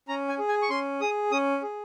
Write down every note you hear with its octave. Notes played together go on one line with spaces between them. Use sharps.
C#4 A#5
G#5
G#4
G#5
C#6
C#4 C6
G#4 D#6
C#4 D#6
G#4